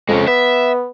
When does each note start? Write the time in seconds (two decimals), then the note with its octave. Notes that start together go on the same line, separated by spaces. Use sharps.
0.09 F2 G#3 C#4
0.28 B3 E5